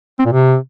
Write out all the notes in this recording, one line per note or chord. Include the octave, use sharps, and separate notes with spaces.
C4
A#2
C3